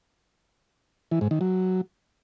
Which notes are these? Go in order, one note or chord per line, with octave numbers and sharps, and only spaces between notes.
E3
G#2
D#3
F#3